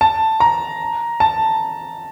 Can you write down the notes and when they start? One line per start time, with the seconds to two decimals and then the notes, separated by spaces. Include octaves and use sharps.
0.01 A5
0.40 A#5
1.20 A5